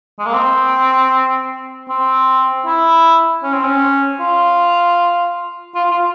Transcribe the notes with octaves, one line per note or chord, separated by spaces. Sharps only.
G#3
A#3
C4
C4
E4
C#4
C4
C#4
F4
F4
F4